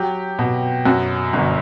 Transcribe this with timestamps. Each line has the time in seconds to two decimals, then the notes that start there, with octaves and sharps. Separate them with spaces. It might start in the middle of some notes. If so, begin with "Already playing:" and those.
Already playing: F#3 G4
0.39 B2
0.85 F#2 F#4
1.33 G1